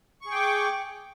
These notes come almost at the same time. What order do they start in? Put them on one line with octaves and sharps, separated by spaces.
C#6 G#4 G5 D6